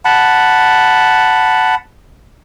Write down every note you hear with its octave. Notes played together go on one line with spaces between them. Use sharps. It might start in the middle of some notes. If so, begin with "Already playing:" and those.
F#5 A5 B5